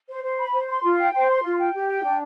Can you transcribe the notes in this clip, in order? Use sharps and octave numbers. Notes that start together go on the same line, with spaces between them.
C5
C5
B5
C5
C6
F4
G5
C5
C6
F4
G5
G4
G5
D4